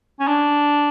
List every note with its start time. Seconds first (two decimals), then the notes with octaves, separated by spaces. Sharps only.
0.20 C#4
0.27 D4